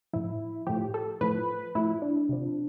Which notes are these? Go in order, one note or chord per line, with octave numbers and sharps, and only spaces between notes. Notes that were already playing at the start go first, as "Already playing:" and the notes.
A2 F3 E4
A2 F3 G4
A4
A2 F3 B4
A2 F3 E4
D4
C3 F3